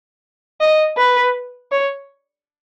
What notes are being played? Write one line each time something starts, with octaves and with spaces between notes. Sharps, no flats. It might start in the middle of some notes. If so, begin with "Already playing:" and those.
D#5
B4
C#5